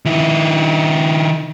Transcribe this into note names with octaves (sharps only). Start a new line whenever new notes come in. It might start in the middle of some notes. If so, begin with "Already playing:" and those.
D#3 E4